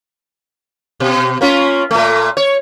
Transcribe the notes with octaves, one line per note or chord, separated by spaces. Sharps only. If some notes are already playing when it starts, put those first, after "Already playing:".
B2
A#3 C#4 F4
A#2 A3
C#5